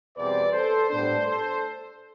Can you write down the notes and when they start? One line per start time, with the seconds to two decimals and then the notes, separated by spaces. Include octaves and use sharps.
0.15 E2 B2 G3 C4 B4 D5
0.52 A4 C5
0.89 A2 G3 B3 D4 A4 C5
1.25 A4 C5